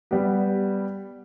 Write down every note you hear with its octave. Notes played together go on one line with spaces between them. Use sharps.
G3 B3 G4